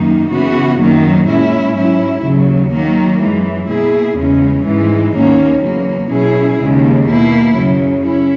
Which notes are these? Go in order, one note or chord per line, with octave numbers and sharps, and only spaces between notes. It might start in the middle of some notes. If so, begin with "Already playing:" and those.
Already playing: F#2 D#3 A#3 D#4
C#3 E3 B3 F#4
F#2 D#3 F#3 A#3
A#2 G#3 C#4 E4
G#2 F#3 C#4 E4
D#2 C#3 F#3
D#3 F#3 A#3
F#2 E3 G#3
B2 A#3 E4 G#4
E2 C#3 G#3 C#4
G#2 E3 G#3
D#2 D#3 A#3 C#4
E2 C#3 F#3 A#3
B2 F#3 C#4 E4 G#4
D#2 C#3 G#3
B2 A#3 E4
F#2 C#3 F#3
C#4 E4